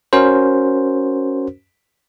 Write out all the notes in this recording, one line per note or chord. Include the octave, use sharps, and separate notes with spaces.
C#4 F#4 A#4 C5